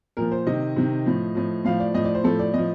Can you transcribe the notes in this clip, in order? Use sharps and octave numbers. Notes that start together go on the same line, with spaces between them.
A#2 F3 A#4
C5
C3 D#3 D#5
C3 D#3
A2 F3
A2 F3
A2 F3 F5
D5
A2 F3 D#5
D5
C5
A2 F3 A4
D5
A2 F3 D#5